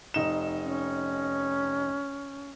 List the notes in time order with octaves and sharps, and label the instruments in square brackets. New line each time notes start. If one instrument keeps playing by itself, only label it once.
[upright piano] F1 D#4 E7
[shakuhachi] C#4